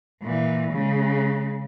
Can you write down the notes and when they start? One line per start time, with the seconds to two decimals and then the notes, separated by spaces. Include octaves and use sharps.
0.22 A#2 E3
0.73 C#3 G#3